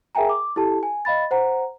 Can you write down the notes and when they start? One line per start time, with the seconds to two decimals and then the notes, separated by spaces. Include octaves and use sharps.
0.15 G#4 A#4 E5 G5 G#5 A#5
0.29 D6
0.56 E4 G4 A4 A5
0.83 G#5
1.05 D#5 F5 B5 A6
1.31 C5 F#5 A#5